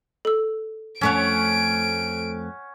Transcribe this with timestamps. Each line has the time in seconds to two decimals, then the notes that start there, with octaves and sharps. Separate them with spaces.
0.25 A4 E6
1.01 F2 A3 C#4 C#5 F#5 D7